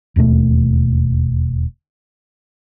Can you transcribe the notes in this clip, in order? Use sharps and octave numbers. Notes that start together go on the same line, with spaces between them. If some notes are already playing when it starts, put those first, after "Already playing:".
E1 D#2 B2 A3